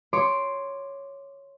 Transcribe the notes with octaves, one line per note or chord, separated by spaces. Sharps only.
C#5 C6 D6